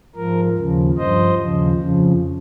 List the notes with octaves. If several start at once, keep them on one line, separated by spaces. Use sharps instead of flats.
G#2 F3 A#4
D#2 C#3 F3
G2 F3 C5 D#5
D#2 C#3 F3
F2 C#3 F3